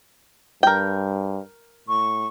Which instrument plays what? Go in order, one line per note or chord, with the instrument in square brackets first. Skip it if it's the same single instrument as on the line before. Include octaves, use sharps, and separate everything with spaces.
[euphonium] G2 [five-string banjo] A#4 G5
[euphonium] A2 [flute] C#6